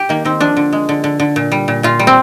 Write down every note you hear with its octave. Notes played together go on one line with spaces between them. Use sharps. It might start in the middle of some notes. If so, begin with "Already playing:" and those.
Already playing: G4
D#3 A#3
D#3 C4
F3 D4
D3
G#3
D3
D3
D3
A#2
G3
A#2
A#2 F4
G3
C4